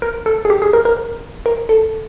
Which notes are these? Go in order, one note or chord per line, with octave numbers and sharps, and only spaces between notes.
A#4
A4
G#4
G4
G#4
A#4
A#4
A#4
A4